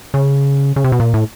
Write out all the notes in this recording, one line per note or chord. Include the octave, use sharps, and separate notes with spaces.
C#3
C#3
C3
B2
A#2
A2